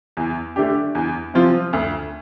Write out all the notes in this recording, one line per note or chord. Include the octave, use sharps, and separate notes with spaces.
E2
D3 A3 D4 G4
E2
C3 F3 C4 F4
D2